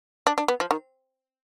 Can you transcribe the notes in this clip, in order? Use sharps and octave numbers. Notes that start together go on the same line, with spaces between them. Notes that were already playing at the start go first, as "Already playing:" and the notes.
D4
D4
B3
F3
D#3